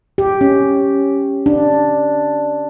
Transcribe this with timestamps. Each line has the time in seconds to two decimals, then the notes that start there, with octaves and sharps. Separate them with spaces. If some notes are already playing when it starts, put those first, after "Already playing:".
0.18 G4
0.41 C#4
1.46 D4